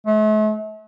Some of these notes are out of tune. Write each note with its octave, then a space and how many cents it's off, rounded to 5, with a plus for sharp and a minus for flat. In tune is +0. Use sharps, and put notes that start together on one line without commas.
A3 -40